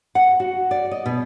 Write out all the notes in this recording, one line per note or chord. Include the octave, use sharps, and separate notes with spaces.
F#5
F#4
D5
D#5
B2